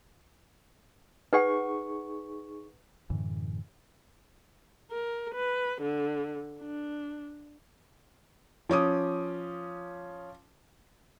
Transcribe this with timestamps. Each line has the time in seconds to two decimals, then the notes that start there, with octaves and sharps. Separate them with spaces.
1.33 D#4 G#4 B4 F#5 C#6
3.10 F#2 A2 D3 E3
4.91 A#4
5.34 B4
5.82 D3
6.61 D4
8.69 F3 C#4 D6 D#6